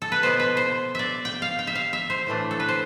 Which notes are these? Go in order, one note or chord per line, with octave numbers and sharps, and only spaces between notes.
A4
B4
B2 B3 E4 C5
B4
C5
D5 E5
G5
F5
G5
E5
F5
E5
C5
A2 E3 A3 D4
A4
B4
C5